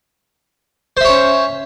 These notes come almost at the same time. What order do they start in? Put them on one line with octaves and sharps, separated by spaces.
C5 E5 C#5 C#4